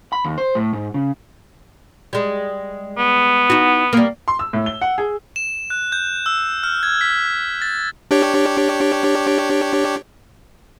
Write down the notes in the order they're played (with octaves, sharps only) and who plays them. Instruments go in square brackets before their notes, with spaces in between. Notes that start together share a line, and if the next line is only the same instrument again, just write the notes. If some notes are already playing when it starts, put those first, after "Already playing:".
[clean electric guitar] B5
D#2
C5
A2
G#2
C#3
[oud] G3 G#3
[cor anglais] B3
[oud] D#4 F#4
G3 A#3
[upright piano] C6
E6
A2
G7
F#5
G#4
[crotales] E7
F#6
G6
E6
F6
G#6
B6
A6
[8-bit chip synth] D4 G4 C#5